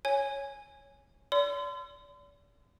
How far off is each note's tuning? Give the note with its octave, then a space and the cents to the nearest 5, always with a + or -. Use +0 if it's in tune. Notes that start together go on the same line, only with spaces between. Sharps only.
C#5 +0 G#5 +0
D5 -40 C6 -40 E6 +45